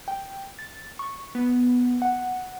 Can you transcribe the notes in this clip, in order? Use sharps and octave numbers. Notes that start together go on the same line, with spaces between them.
G5
A6
C#6
B3
F#5